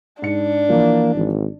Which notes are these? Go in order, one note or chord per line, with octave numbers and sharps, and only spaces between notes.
G#2 D4 C#7
E3 F3 A#3
G#1